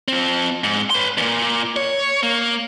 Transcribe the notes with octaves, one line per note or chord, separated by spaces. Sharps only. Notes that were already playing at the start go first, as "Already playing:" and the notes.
F3 C4
G#2
B4 C6
E2 A#2
C#5
A#3